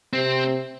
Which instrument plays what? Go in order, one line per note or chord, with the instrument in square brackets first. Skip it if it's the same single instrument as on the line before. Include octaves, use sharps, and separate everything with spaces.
[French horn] C3 [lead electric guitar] C4